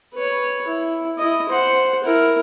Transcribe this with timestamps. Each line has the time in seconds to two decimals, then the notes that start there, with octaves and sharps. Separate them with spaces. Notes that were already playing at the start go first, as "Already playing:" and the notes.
0.14 B4 C#5
0.67 E4
1.18 E4 D#5
1.49 C5 F#5
2.04 E4 A#4